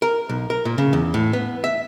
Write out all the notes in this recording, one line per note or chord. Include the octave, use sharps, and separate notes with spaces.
A#4
B1
A#4
A#2
C#3
E2
A2
B3
E5